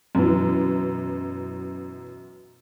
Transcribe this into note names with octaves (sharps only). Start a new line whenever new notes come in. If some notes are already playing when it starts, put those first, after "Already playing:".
F#2 B2 E3